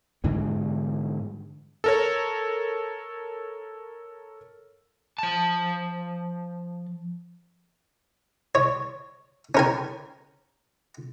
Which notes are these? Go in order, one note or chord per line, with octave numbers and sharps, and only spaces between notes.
G#2 D3 E3 G3
A4 A#4 C#5
F3 A5
C#5
C#4 A#4 G#5